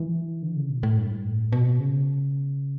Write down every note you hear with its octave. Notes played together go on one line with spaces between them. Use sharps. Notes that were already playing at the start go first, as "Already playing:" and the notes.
Already playing: E3
D3
C#3
B2
A2
G2
A2
B2
C#3